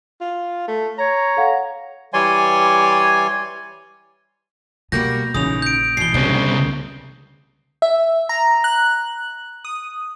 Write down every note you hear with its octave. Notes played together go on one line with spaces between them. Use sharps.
F4
A3
C#5 A#5
A4 F5 F#5
E3 G3 C#5 D5 G#5 C6
B2 G3 A#3 F#4 G6 A#6
A#1 C#3 E3 D#4 D#6 F7
G6 D7
B2 E3 C7 G7
C2 C#3 B3 D4
E5
A#5
F#6
D#6